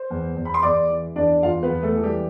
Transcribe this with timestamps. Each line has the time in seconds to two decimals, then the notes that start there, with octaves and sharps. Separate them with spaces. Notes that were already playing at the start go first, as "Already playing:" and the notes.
Already playing: C5
0.10 E2
0.36 E2
0.45 B5
0.54 C6
0.62 E2 D5 D6
0.90 E3
1.16 E2 D4 D5
1.42 E2 F4 F5
1.63 B3 B4
1.69 E2
1.83 A3 A4
1.96 E3
2.03 G3 G4